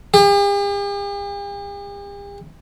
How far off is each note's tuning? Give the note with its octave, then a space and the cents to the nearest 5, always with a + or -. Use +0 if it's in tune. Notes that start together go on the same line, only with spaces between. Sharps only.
G4 +45